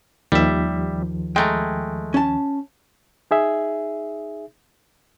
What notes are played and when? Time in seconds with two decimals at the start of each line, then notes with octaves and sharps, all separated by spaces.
0.32 D#2 D#3 F3 G3 E5
1.36 G#3 A3 G5 A#5
2.14 C#4 A5
3.31 D#4 G#4 E5